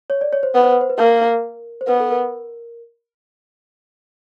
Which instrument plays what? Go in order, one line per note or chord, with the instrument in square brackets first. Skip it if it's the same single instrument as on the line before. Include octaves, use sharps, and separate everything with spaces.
[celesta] C#5
D5
C#5
C5
[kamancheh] B3 [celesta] B4
[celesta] C5
B4
C5
B4
[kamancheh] A#3 [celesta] A#4
[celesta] C5
[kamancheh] B3 [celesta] B4
[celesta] A4
A#4